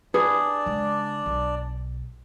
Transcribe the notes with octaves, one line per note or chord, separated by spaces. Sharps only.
D4 G#4 B4 D5
C#3 G#3
B1